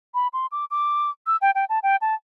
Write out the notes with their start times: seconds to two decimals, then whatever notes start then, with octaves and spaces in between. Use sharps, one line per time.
0.14 B5
0.33 C6
0.52 D6
0.71 D6
1.27 E6
1.41 G5
1.55 G5
1.69 A5
1.83 G5
2.01 A5